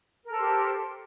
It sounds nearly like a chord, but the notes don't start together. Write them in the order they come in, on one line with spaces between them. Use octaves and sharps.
A#4 A4 C5 G4